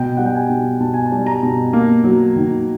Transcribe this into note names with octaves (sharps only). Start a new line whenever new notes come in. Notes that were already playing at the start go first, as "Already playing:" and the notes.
Already playing: B2 G5
G3 F#5
G5
G#5
B2
B2 A5
G#5
A5
G3
A#5
B2
A#3
F#3
D#3